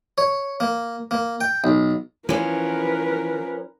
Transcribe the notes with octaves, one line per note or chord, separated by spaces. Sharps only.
C#5
A#3
A#3
G5
B1
E3 F3 C#4 A#4 B4